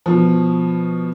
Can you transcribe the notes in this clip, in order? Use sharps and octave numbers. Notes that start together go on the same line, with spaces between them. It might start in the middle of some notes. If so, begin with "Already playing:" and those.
B2 F3